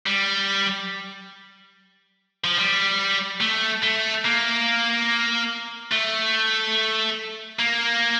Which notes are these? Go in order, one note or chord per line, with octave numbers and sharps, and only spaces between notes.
G3
F3
G3
A3
A3
A#3
A3
A#3